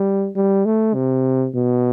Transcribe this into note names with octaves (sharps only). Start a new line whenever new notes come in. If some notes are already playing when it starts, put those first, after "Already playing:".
Already playing: G3
G3
A3
C3
B2